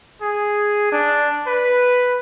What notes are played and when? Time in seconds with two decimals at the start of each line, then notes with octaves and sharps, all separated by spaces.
0.22 G#4
0.92 D4
1.47 B4